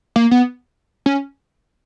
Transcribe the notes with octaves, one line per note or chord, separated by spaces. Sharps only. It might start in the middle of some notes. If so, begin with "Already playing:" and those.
A#3
B3
C#4